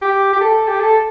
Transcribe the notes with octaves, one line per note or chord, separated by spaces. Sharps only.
G4
G4
A4
G4
A4